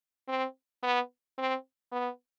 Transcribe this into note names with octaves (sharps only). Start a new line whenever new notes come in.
C4
B3
C4
B3